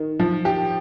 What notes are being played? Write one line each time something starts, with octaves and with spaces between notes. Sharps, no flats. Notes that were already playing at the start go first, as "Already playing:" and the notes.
Already playing: D#3
F3
G4